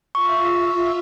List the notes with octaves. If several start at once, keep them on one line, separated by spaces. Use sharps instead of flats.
F4 E5 C#6